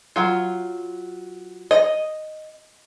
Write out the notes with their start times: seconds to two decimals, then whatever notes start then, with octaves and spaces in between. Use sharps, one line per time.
0.16 F#3 F4
1.71 D#5